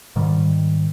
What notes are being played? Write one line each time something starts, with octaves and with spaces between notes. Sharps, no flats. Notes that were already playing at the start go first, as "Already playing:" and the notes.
G#2 D#3 G3